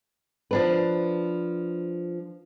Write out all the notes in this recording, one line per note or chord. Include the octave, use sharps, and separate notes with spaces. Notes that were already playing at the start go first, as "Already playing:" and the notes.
F3 D4 B4